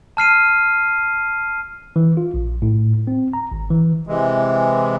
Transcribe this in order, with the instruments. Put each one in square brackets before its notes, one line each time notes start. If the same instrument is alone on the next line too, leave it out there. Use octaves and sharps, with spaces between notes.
[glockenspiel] A5 F6 C7 D#7
[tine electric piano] E3
F4
A#1
A2
C4
A#5
G#1
E3
[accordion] C3 E3 G#3